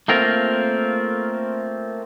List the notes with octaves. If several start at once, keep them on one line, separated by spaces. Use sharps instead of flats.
A3 A#3 C4 F4 A#4